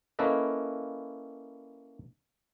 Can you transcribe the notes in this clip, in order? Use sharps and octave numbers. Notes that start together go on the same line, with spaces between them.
A#3 C#4 E4 A4 B4 D#5